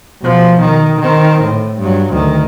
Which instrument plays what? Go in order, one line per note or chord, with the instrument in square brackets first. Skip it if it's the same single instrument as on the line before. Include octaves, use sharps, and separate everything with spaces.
[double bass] B2 F3
D#3
D#3 C4
A2
G2 F#3
D2 D#3